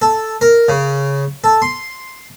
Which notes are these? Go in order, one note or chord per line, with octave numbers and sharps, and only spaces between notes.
A4
A#4
C#3
A4
C6